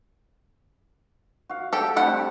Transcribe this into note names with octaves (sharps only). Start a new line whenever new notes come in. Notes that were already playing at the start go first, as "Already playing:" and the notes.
F#4 F5
G4 A4
G3 A3 C4 D4 F#5 B5